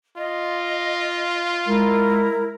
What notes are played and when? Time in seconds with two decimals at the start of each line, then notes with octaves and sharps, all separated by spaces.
0.17 F4 D#5
1.67 G#3 E4 A#4